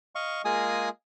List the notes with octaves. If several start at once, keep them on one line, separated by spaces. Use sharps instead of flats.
D#5 F5 C#6
G#3 A#3 F4 G#4 G#5 D#6